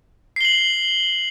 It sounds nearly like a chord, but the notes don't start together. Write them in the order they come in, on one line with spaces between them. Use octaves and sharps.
C7 G7 F#7